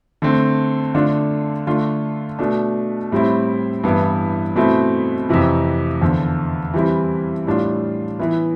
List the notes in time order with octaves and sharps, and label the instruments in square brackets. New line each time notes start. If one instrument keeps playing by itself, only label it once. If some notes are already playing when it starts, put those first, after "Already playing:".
[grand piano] D3 A3 C4
D3 A3 D4 F4
D3 A3 D4 F4
B2 A3 D4
A2 G3 C4 E4
G2 E3 B3 E4
B2 A3 C4 E4
F2 C3 E3
E2 D3 F3
E3 G3 C4 E4
A2 G3 D4 F4
E3 B3 E4